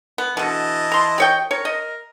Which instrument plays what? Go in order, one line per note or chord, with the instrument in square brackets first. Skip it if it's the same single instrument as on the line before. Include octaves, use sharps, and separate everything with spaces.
[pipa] B3
[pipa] B2 D3 [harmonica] E3 D#5 A5
[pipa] A#5 C6
G4 C#5 G5
[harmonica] A#4 [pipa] C#5
[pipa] D#5